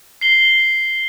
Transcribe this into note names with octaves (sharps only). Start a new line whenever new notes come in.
C7 G7